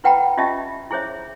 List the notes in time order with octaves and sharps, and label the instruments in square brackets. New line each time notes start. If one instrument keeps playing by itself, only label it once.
[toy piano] E4 B4 F#5 G5 A#5 B5
C#4 F4 G4 D#5 E5 A5
E4 G#4 C5 C#5 E5